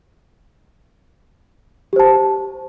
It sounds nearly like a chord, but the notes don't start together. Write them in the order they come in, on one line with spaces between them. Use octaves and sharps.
G4 C5 A5